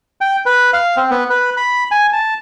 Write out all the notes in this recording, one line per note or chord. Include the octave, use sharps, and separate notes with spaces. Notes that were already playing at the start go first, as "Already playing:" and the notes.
G5
B4
F5
C4
B3
B4
B5
G#5
A5